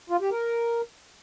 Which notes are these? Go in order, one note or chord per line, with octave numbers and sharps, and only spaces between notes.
F4
G4
A#4